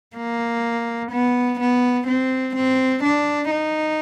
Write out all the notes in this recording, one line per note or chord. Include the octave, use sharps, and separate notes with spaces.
A#3
B3
B3
C4
C4
D4
D#4